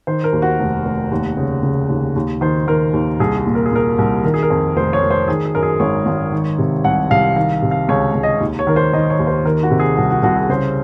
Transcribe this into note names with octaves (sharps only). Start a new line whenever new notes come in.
D#3 C5
A#4
D#2
F#4
F1
F1
D#2
C#3
C#3
D#2
D#2
D#3 C5
D#3 A#4
D#2
C2 G#4
G#4
A#2
A#4
G#4
A#2 A#4
C2
D#3 A#4
G#4
A#4
F2
F1 C5
C#5
F1
C5
D#3 G#4
G#4
F#2 A#4
G#4
G#1 C#5
G#1
D#3
C3
C2 F#5
C2 F5
D#3 F5
C3
F5
C#2 C#5
C#2
D#5
D#2
C#5
D#3 A#4
C5
D#3 D#5
C#5
D#2
C5
D#3 A#4
F#4
C3
G#4
C2 F#4
F#4
C2 F#4
G#4
C#3 C5